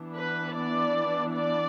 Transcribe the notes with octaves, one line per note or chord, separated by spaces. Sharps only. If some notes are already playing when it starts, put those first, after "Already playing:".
Already playing: E3 B3 D4
B4
D5
D5